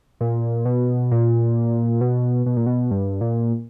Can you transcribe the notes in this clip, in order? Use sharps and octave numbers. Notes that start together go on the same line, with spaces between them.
A#2
B2
A#2
B2
B2
A#2
B2
G2
A#2